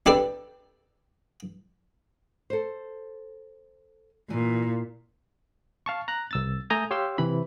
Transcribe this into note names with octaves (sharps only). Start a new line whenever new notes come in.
D4 G4 A4 B4 D5
A4 C5
A#2 E3
F5 A5 C#6
A#5 F#6
C2 E6 A6
A3 G#5 A#5 D#6 G6
G4 C#5 F5 C6 E6
C3 E3 B5